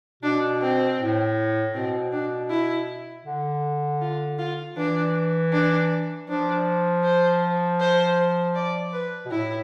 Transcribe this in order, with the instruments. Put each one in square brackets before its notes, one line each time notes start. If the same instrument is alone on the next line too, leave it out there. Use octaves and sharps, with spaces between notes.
[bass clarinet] B2 [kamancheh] D4
[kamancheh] C4
[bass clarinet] A2
[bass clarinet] B2 [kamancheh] C4
[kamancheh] D4
E4
[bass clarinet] D3
[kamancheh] F4
F4
[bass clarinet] E3 [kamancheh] D4
[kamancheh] D4
[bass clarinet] F3 [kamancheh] D4
[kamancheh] C5
C5
D5
B4
[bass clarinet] B2
[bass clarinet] A2 [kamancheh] E4